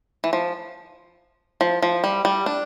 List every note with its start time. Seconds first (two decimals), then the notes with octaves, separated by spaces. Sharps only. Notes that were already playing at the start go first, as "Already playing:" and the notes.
0.24 E3
0.33 F3
1.61 F3
1.82 F3
2.04 G3
2.25 G3
2.46 D4